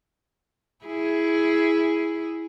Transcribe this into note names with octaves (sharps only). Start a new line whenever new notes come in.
E4 G#4